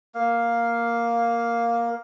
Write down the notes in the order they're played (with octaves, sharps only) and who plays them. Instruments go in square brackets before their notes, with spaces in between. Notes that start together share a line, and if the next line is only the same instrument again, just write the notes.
[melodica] A#3 F5